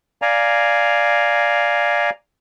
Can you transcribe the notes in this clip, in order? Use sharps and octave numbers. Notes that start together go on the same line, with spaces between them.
D5 F5 G#5 A#5